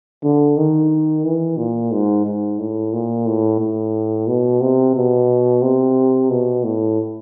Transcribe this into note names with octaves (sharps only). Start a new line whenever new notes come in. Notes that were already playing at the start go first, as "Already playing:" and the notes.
D3
D#3
E3
A#2
G#2
G#2
A2
A#2
A2
A2
B2
C3
B2
C3
B2
A2